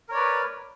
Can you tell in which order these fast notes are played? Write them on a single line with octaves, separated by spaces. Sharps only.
A#4 C#5 D5 B4